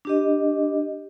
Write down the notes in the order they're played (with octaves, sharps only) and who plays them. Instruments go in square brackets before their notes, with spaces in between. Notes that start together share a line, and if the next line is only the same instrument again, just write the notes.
[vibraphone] D4 G4 D#5